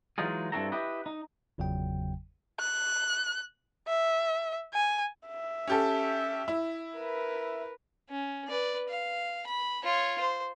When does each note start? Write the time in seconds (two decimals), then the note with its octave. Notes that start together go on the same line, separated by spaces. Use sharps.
0.18 E3 F#3 G#3 D#4 F4 G#4
0.52 G2 C4 E4 F#4 A4 A#5
0.72 E4 G4 B4 D#5
1.06 D#4
1.58 G1 E2 C#3 F#3 G5
2.60 F#6
3.87 E5
4.73 G#5
5.27 E5
5.68 C#4 G4 A4
6.48 E4
6.97 A#4 B4
8.09 C#4
8.48 B4 D5
8.89 F5
9.46 B5
9.84 F4 C#5
10.20 C5